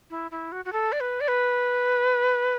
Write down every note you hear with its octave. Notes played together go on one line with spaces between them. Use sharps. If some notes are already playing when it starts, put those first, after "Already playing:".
E4
E4
F#4
F#4
A4
D5
B4
D5
B4